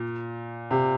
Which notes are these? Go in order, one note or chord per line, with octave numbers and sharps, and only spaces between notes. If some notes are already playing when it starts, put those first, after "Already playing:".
Already playing: A#2
C3